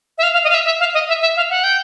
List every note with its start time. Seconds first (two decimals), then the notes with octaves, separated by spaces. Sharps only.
0.18 E5
0.23 F5
0.33 F5
0.44 D#5
0.49 F5
0.54 E5
0.65 E5
0.80 F5
0.94 D#5
1.08 E5
1.21 E5
1.36 F5
1.50 F#5
1.64 G5